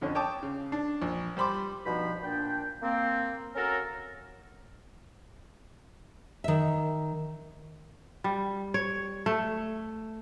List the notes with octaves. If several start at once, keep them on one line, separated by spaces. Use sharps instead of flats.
F2 D3 C#4
C#5 G5 A5 D6 D#6
C#3
D4
A#1
G3 C5 B5 C6 D6
G2 B2 F3 D#4 C5 B5
A#2 D4 G5
A#3 C4
C#4 F#4 A4 A#4
D#3 E5
G3
C#5
A3